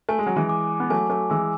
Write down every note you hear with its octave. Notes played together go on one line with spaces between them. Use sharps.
A3 G#5
G#3
F#3
E3 G#3
D6
B3
F#3 A3 G#5
F#3 A3
E3 G#3 E6